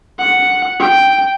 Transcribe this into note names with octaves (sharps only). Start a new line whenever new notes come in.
F#5
G5